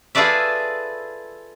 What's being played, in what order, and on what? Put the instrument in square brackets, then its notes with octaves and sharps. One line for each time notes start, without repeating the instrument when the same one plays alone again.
[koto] F4 G#4 A4 B4 D5 E5